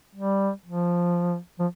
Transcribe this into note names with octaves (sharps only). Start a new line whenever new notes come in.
G3
F3
F3